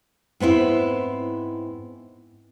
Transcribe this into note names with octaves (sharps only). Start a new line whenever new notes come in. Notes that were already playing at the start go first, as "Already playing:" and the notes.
G#2 B3 C4 E4